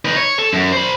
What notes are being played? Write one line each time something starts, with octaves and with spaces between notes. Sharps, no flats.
D#4 B4
C#5
A4
F#2
C5 B5